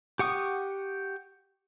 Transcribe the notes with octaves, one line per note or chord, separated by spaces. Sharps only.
G4 F#5 C#6 D#6